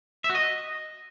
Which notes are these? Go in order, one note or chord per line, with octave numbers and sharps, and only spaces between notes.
E5
F#4
D#5